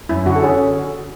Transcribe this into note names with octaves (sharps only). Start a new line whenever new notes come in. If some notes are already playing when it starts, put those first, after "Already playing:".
F#2 E4
D3 F#4
A4
C#4 G#4